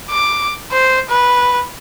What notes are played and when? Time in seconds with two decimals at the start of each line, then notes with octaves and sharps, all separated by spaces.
0.10 D6
0.72 C5
1.09 B4